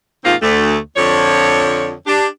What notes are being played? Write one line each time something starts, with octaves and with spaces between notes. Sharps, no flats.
G#2 C3 D#3 A#3 C4 F4
D2 A3
F2 D3 F3 C#5
D4 G4